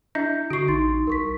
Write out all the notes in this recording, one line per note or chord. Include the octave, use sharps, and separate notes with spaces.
D4 E4 D#5 E5 G6
D3 F#4 C#6 C7 D7
A1 D#4 C6 A6
C2 A#4 C#6 B6